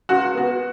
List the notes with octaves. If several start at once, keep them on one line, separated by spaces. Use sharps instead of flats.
C#2 F#4
B3 F#4